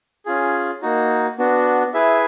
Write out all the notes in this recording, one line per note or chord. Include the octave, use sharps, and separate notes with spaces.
C#4 F4 G#4
A#3 D#4 F#4
B3 D4 F#4
E4 G#4 B4 E5